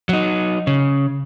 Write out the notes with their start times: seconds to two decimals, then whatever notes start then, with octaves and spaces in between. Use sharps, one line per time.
0.09 F#3 D#4
0.67 C#3